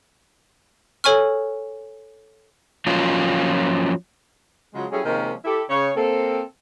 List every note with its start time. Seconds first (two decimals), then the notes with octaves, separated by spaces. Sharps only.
1.04 A4 C#5 G#5 C#6 F6
2.87 F3 F#3 A#3 C#4 F4
4.74 C#3 F3 F#3 G#3
4.92 F#3 G3 C#4 E4 G#4 A4
5.05 C3 D#3 F3 G#3 A#3 C#4
5.45 E4 G4 A4
5.70 C#3 C#5
5.97 A#3 C4 A4